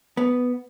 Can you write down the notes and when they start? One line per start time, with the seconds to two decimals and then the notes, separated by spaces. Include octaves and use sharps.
0.17 B3